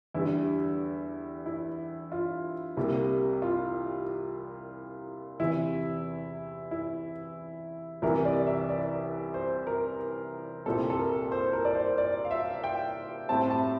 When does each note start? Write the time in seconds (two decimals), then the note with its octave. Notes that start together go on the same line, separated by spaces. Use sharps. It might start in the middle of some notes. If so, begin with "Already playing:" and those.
0.14 E2 D3 G3 E4
1.46 E4
2.12 F4
2.77 C2 C3 G3 A#3
3.42 F4
5.40 E2 C3 E3 E4
6.71 E4
8.02 C2 C3 E3 A#4
8.25 D5
8.47 E5
8.69 D5
9.34 C5
9.67 A#4
10.66 C2 A#2 G3 C4 A4
10.90 A4
10.99 A#4
11.32 C5
11.53 A#4
11.65 D5
11.75 C5
11.98 D5
12.25 F5
12.31 E5
12.64 G5
13.29 A2 G3 C4 A5
13.50 A5